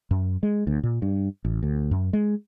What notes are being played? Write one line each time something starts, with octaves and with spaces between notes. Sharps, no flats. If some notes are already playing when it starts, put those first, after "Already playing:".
F#2
G#3
D2
A#2
G2
A1
D2
F#2
G#3